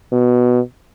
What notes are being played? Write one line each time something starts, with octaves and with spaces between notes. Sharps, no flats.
B2